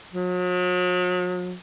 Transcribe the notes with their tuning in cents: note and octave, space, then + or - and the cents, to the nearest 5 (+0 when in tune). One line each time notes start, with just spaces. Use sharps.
F#3 -45